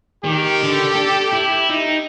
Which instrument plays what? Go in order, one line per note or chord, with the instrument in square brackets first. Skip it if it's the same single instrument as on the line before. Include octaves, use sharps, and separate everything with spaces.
[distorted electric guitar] D#3 [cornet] G4
[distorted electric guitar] D3
A4
E4
D#4